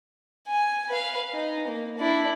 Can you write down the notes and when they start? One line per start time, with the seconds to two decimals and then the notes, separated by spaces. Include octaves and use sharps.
0.47 G#5
0.89 B4 F5
1.34 D#4
1.68 A#3
1.98 D4 E4